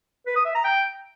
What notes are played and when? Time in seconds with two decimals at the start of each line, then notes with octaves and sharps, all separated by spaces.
0.26 B4
0.36 D#6
0.45 E5
0.55 A#5
0.64 G5